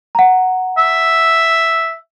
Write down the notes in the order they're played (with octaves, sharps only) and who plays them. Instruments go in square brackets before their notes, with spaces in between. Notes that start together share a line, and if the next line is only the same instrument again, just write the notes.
[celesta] F#5 A#5
[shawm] E5